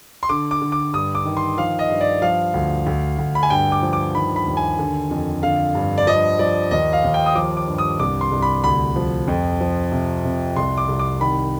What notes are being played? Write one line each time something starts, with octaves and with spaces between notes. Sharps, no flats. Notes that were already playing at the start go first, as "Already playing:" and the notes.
C6
D3 D6
D6
D3
D6
G2 D#6
D6
D#3
C6
F3 F5
D#5
G2
D5
F3 F5
D2
D2
D2
B5
G#5
G2 G5
D6
F3
D6
D#3 B5
B5
D#2
G#5
D3
F2
D3 F5
G2
D5
F3 D#5
F3 D5
D#2 D#5
F5
D#2
G5
D#6
F3 D6
D6
G2
D#6
C2 D6
C6
C2
B5
D2 B5
F3
F2
F3
C3
C3
C2 C6
D6
C2
D6
D#3 B5